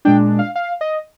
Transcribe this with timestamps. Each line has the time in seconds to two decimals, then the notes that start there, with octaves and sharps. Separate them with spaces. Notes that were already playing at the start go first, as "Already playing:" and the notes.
0.05 A#2 G#3 D4 G5
0.39 F5
0.55 F5
0.81 D#5